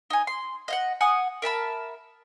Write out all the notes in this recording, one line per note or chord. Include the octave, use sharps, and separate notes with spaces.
D#4 G#5
C6
D#5 F5 F#5
F#5 G#5 D#6
A#4 E5 A5 B5